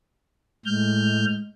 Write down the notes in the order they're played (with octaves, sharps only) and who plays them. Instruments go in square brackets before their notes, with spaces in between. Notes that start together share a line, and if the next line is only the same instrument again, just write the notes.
[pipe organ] A2 F6 G6 [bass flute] G#3